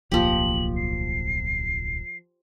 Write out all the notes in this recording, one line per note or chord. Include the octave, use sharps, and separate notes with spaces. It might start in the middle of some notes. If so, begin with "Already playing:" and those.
D1 B1 F3 A#3 G4 F#7
C7